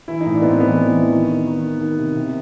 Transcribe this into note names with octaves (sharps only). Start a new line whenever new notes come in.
E3 E4
D#4
A2
D4
A2 B3 C4
E3 B3
E3
E3
D#3
D#3
D#3
D#3
D#3
C3
C3